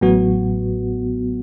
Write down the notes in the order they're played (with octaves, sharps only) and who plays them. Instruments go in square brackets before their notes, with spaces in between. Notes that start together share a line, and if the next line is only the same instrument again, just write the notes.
[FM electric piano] A1 A2 F#3 B3 F#4